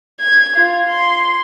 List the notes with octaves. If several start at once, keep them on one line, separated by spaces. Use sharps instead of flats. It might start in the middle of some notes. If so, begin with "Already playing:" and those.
G#6
F4
C6